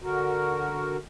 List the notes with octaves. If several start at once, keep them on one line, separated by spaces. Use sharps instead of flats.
D3 F#4 A#4